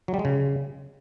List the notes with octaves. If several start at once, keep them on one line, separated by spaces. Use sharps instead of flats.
F#3
G3
G#3
C#3